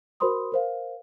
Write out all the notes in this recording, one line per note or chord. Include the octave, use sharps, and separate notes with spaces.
F#4 A#4 C5 B5 C6 D#6
A#4 C5 F5